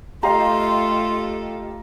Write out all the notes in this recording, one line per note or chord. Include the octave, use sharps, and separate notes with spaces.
A3 F4 G4 A4 D#5 F5 A#5 C6